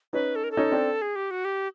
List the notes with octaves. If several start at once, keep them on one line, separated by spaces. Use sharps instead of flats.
C#4 D#4 B4
A4
A#4
A4
C#4 D#4
C4 D4
G#4
G4
F#4
G4